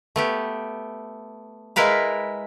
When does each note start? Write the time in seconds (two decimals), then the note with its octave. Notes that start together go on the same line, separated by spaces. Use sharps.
0.16 A3 B3 G4
1.76 G#3 E4 A#4 B4 F5